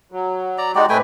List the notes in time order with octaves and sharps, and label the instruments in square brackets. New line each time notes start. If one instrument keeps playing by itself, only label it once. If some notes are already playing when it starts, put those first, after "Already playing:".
[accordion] F#3
[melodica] D5 A#5
[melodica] G#3 G4 D5 [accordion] D#4 F#4
[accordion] A2 C4 B4 [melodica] A3 G5 G#5